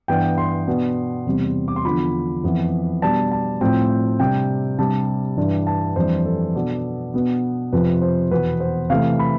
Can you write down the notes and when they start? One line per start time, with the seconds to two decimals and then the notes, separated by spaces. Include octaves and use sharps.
0.08 G2 E3 B3 D4 G5
0.38 C6
0.67 B2 B3 D4
1.26 E2 C3 G3 C4
1.68 D6
1.76 C6
1.85 E2 D3 F3 B5
2.43 F2 E3 B3
3.02 B2 G3 D4 A5
3.31 A5
3.61 A2 F3 C4 G5
4.20 C3 G3 D4 G5
4.79 C3 G3 D4 A5
5.37 G2 E3 G3 D4
5.67 A5
5.96 F2 E3 G3 D4 C5
6.25 A4
6.55 B2 B3 D4
7.14 B2 B3 D4
7.73 F2 C3 F3 B4
8.02 C5
8.31 E2 B2 B3 B4
8.60 C5
8.90 C3 E3 A3 F5
9.19 B5